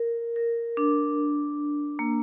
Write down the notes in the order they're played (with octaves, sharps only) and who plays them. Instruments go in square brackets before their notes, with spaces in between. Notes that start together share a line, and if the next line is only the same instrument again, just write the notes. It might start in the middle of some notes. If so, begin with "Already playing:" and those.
Already playing: [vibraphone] A#4
A#4
D4
A#3